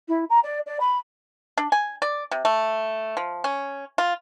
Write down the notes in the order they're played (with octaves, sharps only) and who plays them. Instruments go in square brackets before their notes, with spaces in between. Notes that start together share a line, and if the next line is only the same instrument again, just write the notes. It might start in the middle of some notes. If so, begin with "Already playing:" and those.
[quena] E4
A#5
D5
D5
B5
[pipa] D4
G#5
D5
C3
A3
F3
C#4
F4